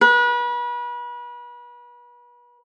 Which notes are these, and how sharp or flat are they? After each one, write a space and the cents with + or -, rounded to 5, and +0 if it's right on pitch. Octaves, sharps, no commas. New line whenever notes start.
B4 -35